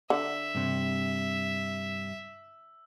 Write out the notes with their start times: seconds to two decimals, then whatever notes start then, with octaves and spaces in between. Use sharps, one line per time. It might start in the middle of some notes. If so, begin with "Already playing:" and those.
0.10 D3 E5 E6
0.55 G2 C3